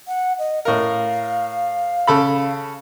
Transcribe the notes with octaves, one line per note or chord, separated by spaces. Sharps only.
F#5
D#5
A2 A#4 F5
C#3 A4 B5